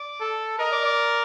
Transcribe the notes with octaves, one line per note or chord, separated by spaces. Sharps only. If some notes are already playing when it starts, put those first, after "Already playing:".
Already playing: D5
A4
A#4 D#5
D5
D5